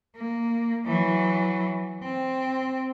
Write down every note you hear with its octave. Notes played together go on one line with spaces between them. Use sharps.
A#3
E3 F#3
C4